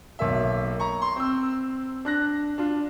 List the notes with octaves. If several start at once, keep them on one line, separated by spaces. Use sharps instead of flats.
B1 A#3 E5
A#5 C#6
C6
C4 E6
D4 F#6 A#6
D4 F4